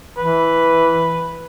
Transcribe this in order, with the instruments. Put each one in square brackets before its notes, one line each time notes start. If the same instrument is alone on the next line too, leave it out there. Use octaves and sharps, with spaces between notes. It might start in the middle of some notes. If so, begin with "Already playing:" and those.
[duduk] E3 [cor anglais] B4